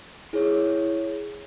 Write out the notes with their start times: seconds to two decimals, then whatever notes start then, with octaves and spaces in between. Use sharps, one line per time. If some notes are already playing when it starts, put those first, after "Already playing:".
0.33 E4 G#4 C#5